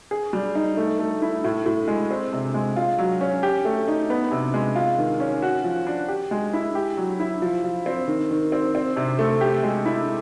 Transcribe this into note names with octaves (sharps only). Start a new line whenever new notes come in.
G#4
G3
D#4
A3
A3
E4
A2
A2
G#3
C4
C3
G#3
F4
F#3
C#4
G4
A3
D#4
B3
C3
G#3
F4
D#3
C#4
F#4
F3
D4
G4
G#3
E4
G4
F#3
E4
F3
F3
C4
D#3
D#3
C4
C4
C3
A3
G4
G#3
E4